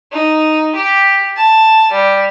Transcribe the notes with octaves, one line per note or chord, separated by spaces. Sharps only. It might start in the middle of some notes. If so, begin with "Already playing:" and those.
D#4
G4
A5
G3